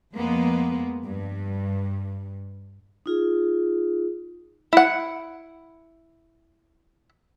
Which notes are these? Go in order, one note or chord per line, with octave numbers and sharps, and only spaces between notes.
F2 G#3 A#3 B3
G2
D#4 F4 G#4
E4 F#5